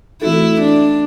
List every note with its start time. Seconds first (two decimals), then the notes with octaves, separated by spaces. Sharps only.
0.22 E3 A3 C4 E4 F#4 A4
0.61 D4